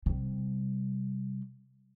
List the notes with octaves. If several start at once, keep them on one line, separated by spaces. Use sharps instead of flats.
C3 G3